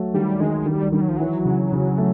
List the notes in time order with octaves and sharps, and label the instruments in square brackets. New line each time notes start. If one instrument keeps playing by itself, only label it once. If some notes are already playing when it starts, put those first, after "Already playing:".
Already playing: [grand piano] F#3 A3
[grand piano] D#3 [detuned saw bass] G3
[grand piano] D#3 [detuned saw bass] G#3
[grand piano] D#3 [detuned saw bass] G3
[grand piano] D#3 [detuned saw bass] G3
[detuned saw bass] F#3
F3
[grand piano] E3 [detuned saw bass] F#3
[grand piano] C#3
C#3
A3